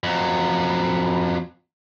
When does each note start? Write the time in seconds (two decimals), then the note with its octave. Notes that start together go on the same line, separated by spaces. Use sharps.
0.03 F2 F#3